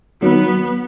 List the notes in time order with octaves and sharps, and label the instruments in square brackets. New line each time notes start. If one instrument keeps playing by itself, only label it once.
[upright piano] D#3 F#3 [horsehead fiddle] B3